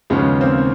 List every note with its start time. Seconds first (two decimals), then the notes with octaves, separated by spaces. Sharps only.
0.10 D#2 C#3 F3 G#3 B3 C#4
0.41 A#3 C4